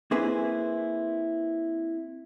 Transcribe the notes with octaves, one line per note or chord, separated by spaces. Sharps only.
A#3 C4 E4 G#4 B4